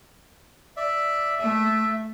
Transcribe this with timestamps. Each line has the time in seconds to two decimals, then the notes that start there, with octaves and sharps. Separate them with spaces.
0.77 D5 E5
1.39 A3 E5